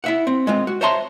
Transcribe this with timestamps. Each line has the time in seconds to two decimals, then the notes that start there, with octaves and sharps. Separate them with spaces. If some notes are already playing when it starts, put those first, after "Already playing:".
0.04 E4 E5 F#5
0.27 C4
0.47 G#3 C4 F4
0.67 F#4
0.81 C5 C#5 E5 A5 A#5 C6